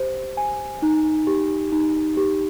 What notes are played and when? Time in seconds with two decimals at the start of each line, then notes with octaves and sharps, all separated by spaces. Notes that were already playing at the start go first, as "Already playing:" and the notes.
Already playing: G4 C5
0.37 G#5
0.82 D#4
1.27 G4
1.72 D#4
2.17 G4